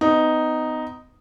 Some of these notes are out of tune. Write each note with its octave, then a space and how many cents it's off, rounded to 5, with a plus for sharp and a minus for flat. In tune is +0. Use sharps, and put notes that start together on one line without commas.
B3 +35 D#4 +0